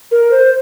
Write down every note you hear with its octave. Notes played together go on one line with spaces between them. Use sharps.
A#4
C5